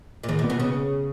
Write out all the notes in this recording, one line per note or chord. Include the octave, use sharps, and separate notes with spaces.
A#2
G#2 D#3
A#2
B3
B2
C#3 B3